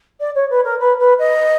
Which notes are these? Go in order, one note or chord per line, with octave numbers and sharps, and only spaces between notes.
D5
C#5
B4
A#4
B4
B4
D#5